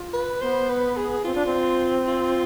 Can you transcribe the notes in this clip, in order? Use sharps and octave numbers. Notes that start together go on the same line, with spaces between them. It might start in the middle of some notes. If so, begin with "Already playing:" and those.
Already playing: F4
B4
B3 C5
B4
G#4
C4 F4
D4
C4
F4